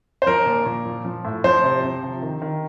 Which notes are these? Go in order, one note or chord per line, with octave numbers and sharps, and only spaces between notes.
C5
F3 A#4
A#2
A#2
F3
F3
A2
F3 C5
C3
F3
C3
D#3
D#3